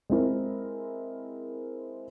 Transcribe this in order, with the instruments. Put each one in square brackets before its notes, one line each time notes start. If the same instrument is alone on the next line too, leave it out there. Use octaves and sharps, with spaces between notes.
[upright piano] G#3 C4 E4 A#4